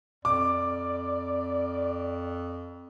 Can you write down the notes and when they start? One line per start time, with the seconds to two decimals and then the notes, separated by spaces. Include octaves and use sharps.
0.25 F2 D5 D6